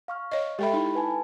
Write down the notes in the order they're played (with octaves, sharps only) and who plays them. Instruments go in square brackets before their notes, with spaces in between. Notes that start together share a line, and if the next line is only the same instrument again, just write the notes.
[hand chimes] F5 C#6 F6
[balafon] C#5 D#5
[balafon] G#3 A4 E5 [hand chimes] G4 G5 B5
[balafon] D#4 [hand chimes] E4 B5
[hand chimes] B4 G#5 A5